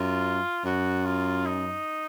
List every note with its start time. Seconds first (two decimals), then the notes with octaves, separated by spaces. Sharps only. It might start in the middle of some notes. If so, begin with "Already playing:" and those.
Already playing: F#2 F4
0.65 F#2 F#4
1.05 F4
1.46 D#4